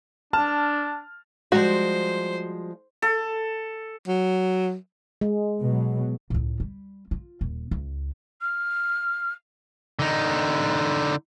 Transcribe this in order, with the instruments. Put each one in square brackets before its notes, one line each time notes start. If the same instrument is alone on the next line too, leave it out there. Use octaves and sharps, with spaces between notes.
[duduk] D4 [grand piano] A5 F6
[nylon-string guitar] F3 G3 G#3 [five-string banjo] F#4 [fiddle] C5
[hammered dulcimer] A4
[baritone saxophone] F#3
[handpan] G#3
[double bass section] B2 F#3
[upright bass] C#2 A2
G3
F4
D#1
C#2
[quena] F6
[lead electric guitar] D3 D#4